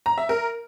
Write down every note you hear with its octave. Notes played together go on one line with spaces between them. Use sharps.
A#5
E5
A#4